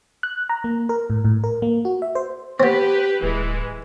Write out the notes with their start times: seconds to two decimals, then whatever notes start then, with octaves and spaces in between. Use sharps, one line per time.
0.23 F#6
0.49 A#5
0.64 A#3
0.89 A#4
1.10 A2
1.25 A2
1.44 A#4
1.62 A#3
1.85 F#4
2.02 E5
2.15 C5
2.60 B3 C4 G4 B4
3.23 D1 E3 G#3